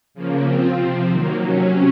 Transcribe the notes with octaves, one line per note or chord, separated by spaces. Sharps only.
C#3 F3 A#3
F3 C4 F4
C3 F3 C4
D#3 F#3 A#3
C3 F#3 C#4